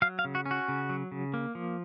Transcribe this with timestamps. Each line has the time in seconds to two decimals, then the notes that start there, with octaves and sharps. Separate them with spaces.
0.02 F#3 F5
0.19 F5
0.25 C#3
0.35 F#4
0.46 C#4
0.51 F#4
0.68 C#3
0.89 F#3
1.12 C#3
1.34 A#3
1.55 F3